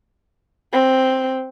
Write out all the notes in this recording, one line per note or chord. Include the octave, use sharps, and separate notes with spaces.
C4